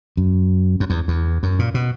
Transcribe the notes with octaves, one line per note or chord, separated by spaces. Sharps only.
F#2
F#2
E2
E2
F#2
A#2
B2